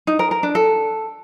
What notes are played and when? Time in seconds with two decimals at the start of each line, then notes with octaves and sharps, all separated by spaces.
0.07 D#4
0.19 A#4
0.31 A#4
0.43 D4
0.55 A4